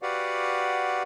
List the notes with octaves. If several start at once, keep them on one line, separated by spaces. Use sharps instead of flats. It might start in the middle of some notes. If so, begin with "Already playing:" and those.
F#4 G4 B4 D5 F5 F#5